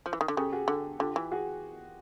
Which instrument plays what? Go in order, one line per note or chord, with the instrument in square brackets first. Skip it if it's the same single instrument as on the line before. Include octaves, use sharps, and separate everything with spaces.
[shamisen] F3
E3
D#3
D3
[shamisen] C#3 [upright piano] G4 A4
[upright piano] F#4 G#4
[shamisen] D3
[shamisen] D3 [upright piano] F4 G4
[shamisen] E3
[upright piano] F#4 G#4